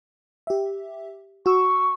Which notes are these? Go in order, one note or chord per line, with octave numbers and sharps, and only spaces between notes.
G4 E5
F#4 C#6 E6